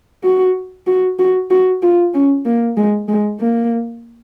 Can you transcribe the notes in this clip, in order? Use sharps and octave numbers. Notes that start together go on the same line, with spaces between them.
F#4
F#4
F#4
F#4
F4
C#4
A#3
G#3
G#3
A#3